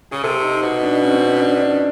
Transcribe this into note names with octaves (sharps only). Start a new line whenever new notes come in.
C#3 G#4
C3 A4
D#4
B2 D#4
D4
C#4
C4
C#4
C#4
D4
C#4
D4